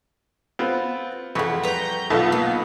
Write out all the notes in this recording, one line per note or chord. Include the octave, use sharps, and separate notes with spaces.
B3 C4 F4
F2 E3 G#4 B4 F#5 C#6
G3 B4 A#5 G6
B1 B3 F4 A4
D2 A#3